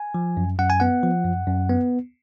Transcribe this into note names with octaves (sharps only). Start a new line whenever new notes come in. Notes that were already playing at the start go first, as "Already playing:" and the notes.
Already playing: G#5
F3
F#2
F#2 F#5
G#5
B3 F#5
F3
F#2
F#2
B3